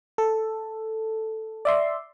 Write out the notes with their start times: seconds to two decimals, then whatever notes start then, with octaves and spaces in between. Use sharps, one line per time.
0.18 A4
1.65 D5 E5 C6